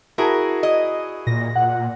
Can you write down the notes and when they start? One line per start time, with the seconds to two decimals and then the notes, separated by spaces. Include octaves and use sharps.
0.18 E4 F#4 G#4 A#4
0.63 D#5
1.27 A#2 A#6
1.56 A#2 F#5